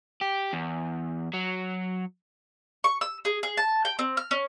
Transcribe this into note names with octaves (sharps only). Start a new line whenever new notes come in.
G4
E2
F#3
C#6
E6
G#4
G#4
A5
G5
C4
F6
C#4